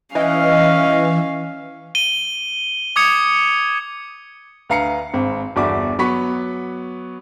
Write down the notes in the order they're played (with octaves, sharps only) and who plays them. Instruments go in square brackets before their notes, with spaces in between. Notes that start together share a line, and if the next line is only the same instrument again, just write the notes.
[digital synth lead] E3 [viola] C#4 F5 [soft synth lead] D#5
[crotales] D#7 G7
D6 D#6 G#6 C#7
[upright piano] D2 B4 F5 A#5 C7 C#7
G#1 C4
G1 E2 F#4 D5 E5 D6
F#3 B3 B5 C#6 B6